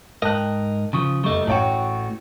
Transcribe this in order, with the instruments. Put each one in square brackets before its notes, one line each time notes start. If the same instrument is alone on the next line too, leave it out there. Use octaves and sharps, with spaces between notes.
[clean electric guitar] G#2 A#4 D#5 [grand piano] G5 A5 F#6
[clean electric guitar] C#3 F3 [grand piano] C#6 D#6
[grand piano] F1 D#5 C#6 [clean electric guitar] G3 A3
[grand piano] A1 C#5 G5 [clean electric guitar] A2 F#4